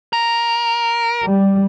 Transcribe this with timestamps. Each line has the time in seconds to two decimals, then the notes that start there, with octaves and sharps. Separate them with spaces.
0.13 A#4
1.23 G3